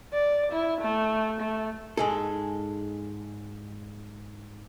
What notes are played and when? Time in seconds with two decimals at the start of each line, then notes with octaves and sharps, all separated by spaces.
0.13 D5
0.52 E4
0.81 A3
1.40 A3
1.97 G#2 G#3 A4